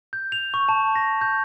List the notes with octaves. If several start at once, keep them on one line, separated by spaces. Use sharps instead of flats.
G6
F7
C#6
A5
A#6
G6